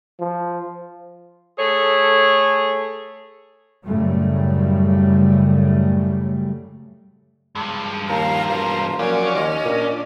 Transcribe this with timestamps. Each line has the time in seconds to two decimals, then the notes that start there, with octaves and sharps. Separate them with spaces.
0.20 F3
1.59 A3 G#4 A4 C#5
3.86 F#2 A2 C#3 F#3 G3 A3
7.55 G2 F3 G#3
8.09 D#2 A#3 A#4 F5
8.48 E1 F5
8.99 F3 F#3 A#3 C#4 D5 G#5
9.34 D#2 D#5
9.65 A#2 D4